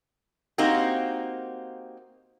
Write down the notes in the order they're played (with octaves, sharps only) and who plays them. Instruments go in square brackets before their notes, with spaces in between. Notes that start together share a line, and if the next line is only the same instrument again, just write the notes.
[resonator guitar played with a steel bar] A#3 C4 D#4 F#4 G4